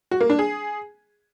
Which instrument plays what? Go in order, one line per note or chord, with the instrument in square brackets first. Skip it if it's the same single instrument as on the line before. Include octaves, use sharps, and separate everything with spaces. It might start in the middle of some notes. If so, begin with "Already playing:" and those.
[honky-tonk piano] F#4
A#3
D4
G#4